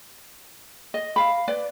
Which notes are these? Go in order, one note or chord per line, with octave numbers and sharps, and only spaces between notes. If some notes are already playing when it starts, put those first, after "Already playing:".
D#5
F5 B5
B4 D5